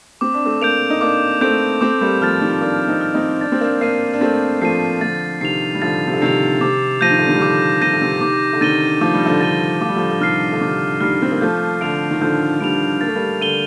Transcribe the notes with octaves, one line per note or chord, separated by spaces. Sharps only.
C4 D6
D4
A3 C4
A#3 D4 G6 D7 F7
D#4
A#3 D4 D6
A3 C4 G6 D7 F7
A3 C4 D6
G3 A#3
F3 A3 F6 A6
D#3 G3
A#3 D4 D6
C4 D#4
F6 A6
C4 D#4
D4 A6
C4
A#3 D4
A#3 D4 C7 D#7
D4
A3 C4 A6
F3 A3 C7 D#7
D3 F3 A6
C3 D#3 C7 F7
G3
D3 F3 A6
C3
D3
C3 D#3 C7 F7
C3 D6
F3 G6 A#6 D#7
D#3
D3
C3 D#3
G3
D3 F3 D6
C3 D#3 G6 A#6 D#7
D3
C3 D#3
C3 D#3 D6
D3
C3 D#3 A6 D#7 G7
F3 D6
G3
D3 F3
D3 A6 D#7 G7
F3 D6
G3
D3 F3
D3
C3 D#3 F6 C7
D3
C3 D#3 D6
D#3 G3 F6 C7
C4
A#3
F3 A3 G6
D3 D7 F7
D#3
D3 F3 G6
D#3 G3 D7 F7
A#3 A6
A3
G3 A#3
D3 D#7 G7